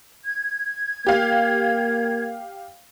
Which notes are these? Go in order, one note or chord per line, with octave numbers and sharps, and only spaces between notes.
G#6
A#3 G4 F5